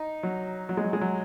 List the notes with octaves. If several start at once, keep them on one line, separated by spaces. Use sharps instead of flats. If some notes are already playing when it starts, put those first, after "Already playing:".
Already playing: D#4
F#3
F#3
G#3
F#3
G#3
F#3